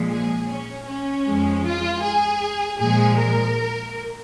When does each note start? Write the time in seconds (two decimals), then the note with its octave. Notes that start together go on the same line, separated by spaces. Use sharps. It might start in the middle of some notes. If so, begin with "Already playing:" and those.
Already playing: A#2 F3 G#3
0.11 G#4
0.48 C#4
0.87 C#4
1.26 F2 F3 G#3
1.64 F4
2.02 G#4
2.79 A#2 F3 G#3 G#4
3.18 A#4